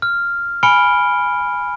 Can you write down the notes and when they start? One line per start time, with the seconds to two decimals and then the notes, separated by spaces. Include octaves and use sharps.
0.02 F6
0.63 G#5 B5 F6 C#7 D7 G7